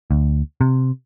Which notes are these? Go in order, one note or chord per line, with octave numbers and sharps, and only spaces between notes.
D2
C3